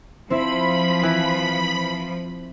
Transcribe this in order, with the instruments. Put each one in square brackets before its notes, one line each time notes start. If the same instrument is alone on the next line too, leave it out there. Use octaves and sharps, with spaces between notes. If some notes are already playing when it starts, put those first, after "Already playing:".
[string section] F3 [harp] C4 E4 [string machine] B5
[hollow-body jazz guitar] E3